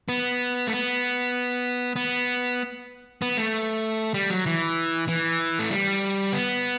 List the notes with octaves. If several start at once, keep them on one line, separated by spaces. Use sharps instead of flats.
B3
A3
B3
B3
B3
A3
G3
F#3
E3
E3
A3
G3
B3